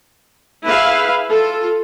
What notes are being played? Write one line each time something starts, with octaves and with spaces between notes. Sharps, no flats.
E4 G#4 B4 E5 F5
F4 A4